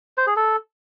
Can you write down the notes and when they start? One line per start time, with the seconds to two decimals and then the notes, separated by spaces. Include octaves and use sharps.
0.18 C5
0.27 G#4
0.36 A4